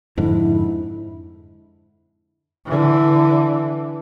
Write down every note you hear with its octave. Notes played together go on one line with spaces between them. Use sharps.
F2 G#2 D3 E4
D3 E3